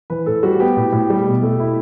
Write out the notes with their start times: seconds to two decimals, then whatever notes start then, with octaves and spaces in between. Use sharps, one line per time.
0.10 E3 B4
0.26 A2 A4
0.43 G3 F#4
0.60 B3 G4
0.77 A2
0.92 A2
1.10 G3
1.26 B2
1.43 A3
1.59 E4